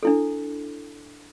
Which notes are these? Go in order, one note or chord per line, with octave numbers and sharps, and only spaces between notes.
D4 E4 A4